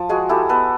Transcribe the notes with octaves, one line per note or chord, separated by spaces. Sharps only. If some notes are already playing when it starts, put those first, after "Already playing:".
Already playing: F3
G#3 F#4 G#4
E4 G4 A4
B3 A4 B4